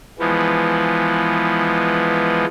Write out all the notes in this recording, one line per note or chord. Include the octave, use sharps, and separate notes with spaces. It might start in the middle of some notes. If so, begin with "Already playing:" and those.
E3 F3 G#3 B3